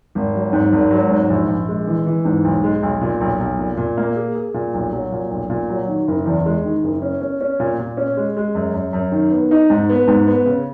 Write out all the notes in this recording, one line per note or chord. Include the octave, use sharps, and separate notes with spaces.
G#1
F#3
G#2
G#1
F#3
G#2
A#1
A#1
G#3
E3
E3
G#2
B1
G#3
B1
A#2
B1
B1
A#2
A#2
A#3
G#4
G#4
A#2
B1
F#3
A#2
B1
A#2
F#3
D#3
F#1
E2
G#3
D#3
F#1
C#4
C#4
C#4
A#2
A#2
C#4
G#3
G#3
F#2
F#2
F#2
D#3
B3
D#4
G#2
B3
G#2
B3
C#3